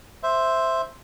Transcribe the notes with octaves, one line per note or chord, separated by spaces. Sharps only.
C5 E5